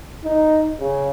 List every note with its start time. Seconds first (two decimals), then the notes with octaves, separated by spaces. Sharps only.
0.24 D#4
0.79 C#3